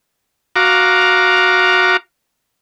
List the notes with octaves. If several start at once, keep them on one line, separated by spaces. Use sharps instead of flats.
F#4 F5 A#5 D6